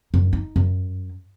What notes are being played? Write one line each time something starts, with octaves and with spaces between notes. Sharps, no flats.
F#2
D#4
F#2